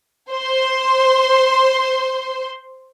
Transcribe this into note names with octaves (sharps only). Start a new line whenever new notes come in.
C5 C6